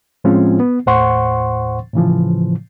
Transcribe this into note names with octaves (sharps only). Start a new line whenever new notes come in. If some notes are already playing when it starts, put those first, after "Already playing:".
A2 F3 G#3 C4 C#4 F4
B3
D#2 A2 C5 F#5 C6 C#6
A2 C#3 E3 F3